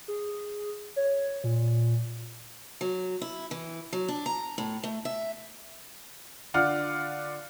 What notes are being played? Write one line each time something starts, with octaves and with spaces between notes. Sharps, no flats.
G#4
C#5
A#2
F#3
E4
E3
F#3
D4
A#5
A2
A3
E5
D3 F4 D5 F#5 F6